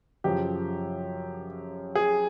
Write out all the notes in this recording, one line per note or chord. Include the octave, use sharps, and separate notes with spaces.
F#2 C#3 F3 G4
G#4